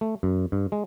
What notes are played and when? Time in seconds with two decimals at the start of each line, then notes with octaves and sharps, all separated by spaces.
0.01 A3
0.23 F#2
0.52 G2
0.72 G#3